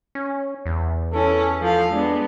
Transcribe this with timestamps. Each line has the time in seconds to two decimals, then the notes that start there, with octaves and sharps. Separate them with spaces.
0.15 C#4
0.66 E2
1.13 E3 C#4 A4
1.61 F3 A4 F5
1.92 G#3 B3 D4